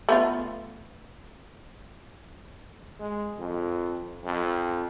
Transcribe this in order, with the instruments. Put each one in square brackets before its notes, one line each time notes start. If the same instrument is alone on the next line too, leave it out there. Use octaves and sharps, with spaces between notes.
[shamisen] A3 B3 F4
[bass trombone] G#3
F2
F2